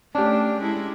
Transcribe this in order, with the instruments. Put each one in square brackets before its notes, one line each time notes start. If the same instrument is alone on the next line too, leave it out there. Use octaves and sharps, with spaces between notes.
[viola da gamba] A3 [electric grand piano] C#4 G4 [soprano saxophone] D4
[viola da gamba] G#3 E4